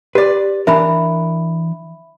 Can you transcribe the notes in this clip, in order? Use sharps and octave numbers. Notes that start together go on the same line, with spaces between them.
G4 B4 D5
E3 D4 A#4 E5 B5